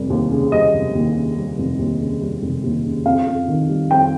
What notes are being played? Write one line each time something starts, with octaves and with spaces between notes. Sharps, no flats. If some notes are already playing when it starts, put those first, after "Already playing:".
Already playing: F1 G3
D#2
C#3
G3 D#5
F1
D#2
C#3
G3
F1
D#2
C#3
G3
F1
D#2
C#3
F2 F5
F2
D#3
G3
F2 G5